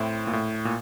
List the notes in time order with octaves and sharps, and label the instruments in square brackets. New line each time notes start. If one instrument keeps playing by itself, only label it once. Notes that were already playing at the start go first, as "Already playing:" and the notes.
Already playing: [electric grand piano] A2 [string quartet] C4 E4
[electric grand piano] A#2
A2
A#2